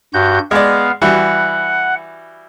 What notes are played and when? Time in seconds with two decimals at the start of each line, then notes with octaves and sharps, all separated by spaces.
0.14 G2 F#4 G6
0.51 G#3 B3 D5 F5
1.02 E3 G3 F#4 F#5